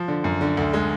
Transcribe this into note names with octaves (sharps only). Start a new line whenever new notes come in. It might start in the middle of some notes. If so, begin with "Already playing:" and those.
Already playing: F3
D3
F#2
D3
D2
G#3